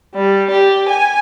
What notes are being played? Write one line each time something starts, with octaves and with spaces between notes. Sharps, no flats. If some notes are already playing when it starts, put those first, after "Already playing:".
G3
G4
G#5